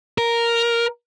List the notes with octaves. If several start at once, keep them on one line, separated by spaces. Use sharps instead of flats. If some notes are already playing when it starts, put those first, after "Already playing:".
A#4